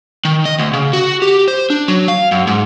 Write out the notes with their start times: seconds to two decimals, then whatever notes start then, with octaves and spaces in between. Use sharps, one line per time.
0.25 D#3
0.45 D#5
0.59 D2
0.73 C#3
0.93 F#4
1.22 G4
1.48 C5
1.70 D4
1.88 F#3
2.08 F5
2.31 F#2
2.47 G#2